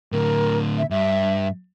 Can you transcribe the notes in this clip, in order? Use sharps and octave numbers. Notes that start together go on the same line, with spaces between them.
A2 D3 A#4
E5
G2 E5